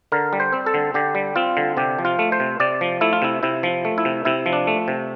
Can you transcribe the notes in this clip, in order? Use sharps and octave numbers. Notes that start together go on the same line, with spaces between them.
D3 A#4
G3
C5
C4
A4
D3
D3 G4
G3
C4 F4
D3
C3 G4
F3
F4
A3
C5
C3
C3 D5
F3
A3 E4
F4
C3 E4
C3 E4
F3
A3
E4
C3
C3 E4
F3
D4
A3
C3